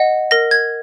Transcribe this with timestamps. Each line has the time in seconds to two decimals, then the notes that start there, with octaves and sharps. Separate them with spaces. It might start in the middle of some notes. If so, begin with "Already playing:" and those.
Already playing: D#5 F#5
0.31 A#4 A#6
0.51 G#6